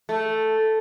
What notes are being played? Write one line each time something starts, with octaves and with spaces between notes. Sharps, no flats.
A3